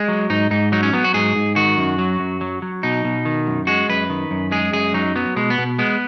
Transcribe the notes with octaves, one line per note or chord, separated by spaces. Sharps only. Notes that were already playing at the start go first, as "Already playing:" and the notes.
Already playing: G#3
F#3
G#2 D#4
G#2 D#4
F#3 D#4
C#4
F#3 B3
F#4
G#2 G#4
G#2
D#3 F#4
F#2
F#3
F#2
F#3
F#3
B2 D#4
B2
D#3
F#2
G#3 F#4
F#2 B4
D#3
F#2
G#3 G#4
F#2 G#4
F#3 D#4
F#3 B3
B2 G#3
B3
B2
G#3 B3